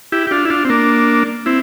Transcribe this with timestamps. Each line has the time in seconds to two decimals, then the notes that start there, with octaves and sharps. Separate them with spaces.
0.12 E4 G4
0.27 G4
0.31 D4 F4
0.45 E4
0.50 D4 F4
0.65 C4
0.69 A#3 D4
1.46 C4 E4